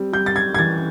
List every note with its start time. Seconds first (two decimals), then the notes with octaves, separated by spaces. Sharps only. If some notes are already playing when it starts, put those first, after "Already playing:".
Already playing: G3 C4
0.13 G3 G6
0.26 A6
0.36 G#6
0.55 G#6
0.59 E3 A6